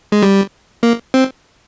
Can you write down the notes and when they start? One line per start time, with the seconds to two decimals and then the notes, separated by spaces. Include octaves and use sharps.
0.12 G#3
0.23 G3
0.83 A#3
1.14 C4